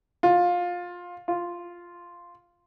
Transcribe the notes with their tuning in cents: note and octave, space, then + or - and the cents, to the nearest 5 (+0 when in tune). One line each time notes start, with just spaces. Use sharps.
F4 +20
F4 +0